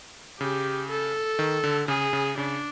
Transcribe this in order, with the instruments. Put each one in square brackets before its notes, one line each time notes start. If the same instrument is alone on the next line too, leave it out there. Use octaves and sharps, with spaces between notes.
[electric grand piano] C#3 [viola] G4
[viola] A4
[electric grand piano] D#3
D3
[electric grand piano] C#3 [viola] G#4
[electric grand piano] C#3
[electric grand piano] C#3 [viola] D4